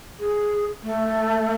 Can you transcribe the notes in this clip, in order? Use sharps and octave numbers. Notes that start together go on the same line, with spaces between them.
G#4
A3